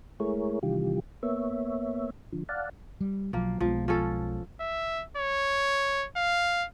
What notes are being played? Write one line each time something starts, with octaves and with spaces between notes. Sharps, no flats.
G#3 A3 E4 G#4 A#4 C#5
C3 D#3 E3 G3 F4 G4
A#3 B3 C#5 E5
D3 F3
D5 F5 F#5 A5
G3
B1 F3 F#3 A#3
B1 F3 G#3 B3
F3 C#4 A4
E5
C#5
F5